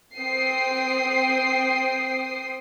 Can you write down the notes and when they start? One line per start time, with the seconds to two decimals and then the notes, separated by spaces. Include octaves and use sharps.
0.18 C4 G5 D#6 C7